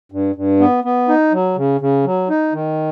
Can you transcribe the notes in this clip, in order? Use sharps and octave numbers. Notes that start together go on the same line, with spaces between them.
G2
G2
B3
B3
D#4
F#3
C#3
C#3
F#3
D#4
D#3